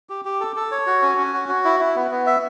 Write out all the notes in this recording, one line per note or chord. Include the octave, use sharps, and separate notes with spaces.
G4
G4
A4
A4
C#5
F#4
C#4
C#4
F#4
F#4
E4
E4
B3
B3
E5